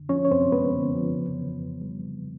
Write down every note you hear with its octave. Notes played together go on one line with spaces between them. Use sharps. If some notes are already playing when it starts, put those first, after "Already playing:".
Already playing: D3
F3 C#4 C#5
C#5
F#2 C4 C5
G#3 B3 B4
D3
F3
C#3
E3
F2
G3
C#3